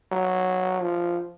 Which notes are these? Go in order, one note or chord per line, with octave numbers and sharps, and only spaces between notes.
F#3
F3